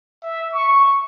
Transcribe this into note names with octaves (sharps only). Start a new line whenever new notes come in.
E5
C#6